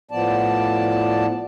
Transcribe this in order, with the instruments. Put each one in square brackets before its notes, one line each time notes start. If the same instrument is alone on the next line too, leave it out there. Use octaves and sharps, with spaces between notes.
[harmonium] A2 F3 B3 D5 A5